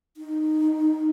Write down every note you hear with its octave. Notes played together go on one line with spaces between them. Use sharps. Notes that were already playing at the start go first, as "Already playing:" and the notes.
D#4